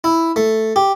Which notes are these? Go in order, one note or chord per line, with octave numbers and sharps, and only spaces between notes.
E4
A3
G4